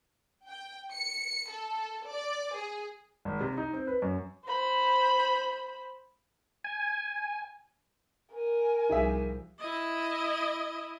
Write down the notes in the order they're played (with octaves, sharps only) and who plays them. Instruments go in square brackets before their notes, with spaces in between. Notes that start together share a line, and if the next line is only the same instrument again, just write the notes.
[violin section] G5
C#7
A4
D5
G#4
[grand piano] G#1
C3
D#4
C4
B4
F#2
[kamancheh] C5 B5
[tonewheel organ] G#5
[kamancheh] A#4 [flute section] G#5
[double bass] C2 F3 [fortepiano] D#4 G#4 E5
[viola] E4 D#5